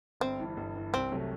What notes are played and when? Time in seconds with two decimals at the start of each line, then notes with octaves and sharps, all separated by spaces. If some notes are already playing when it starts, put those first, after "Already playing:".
0.20 G1 C4
0.40 G2 E3
0.57 G1
0.75 G2 E3
0.93 C2 C4
1.11 C3 F#3 A3